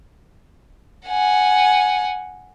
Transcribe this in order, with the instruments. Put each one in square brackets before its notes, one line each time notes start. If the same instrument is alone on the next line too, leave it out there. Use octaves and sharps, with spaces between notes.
[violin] F#5 G#5